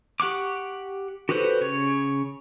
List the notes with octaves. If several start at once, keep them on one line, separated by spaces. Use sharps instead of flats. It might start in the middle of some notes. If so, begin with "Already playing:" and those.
G4 F#5 C#6 D6
F#4 G4 A4 B4 C5
C#3 C#5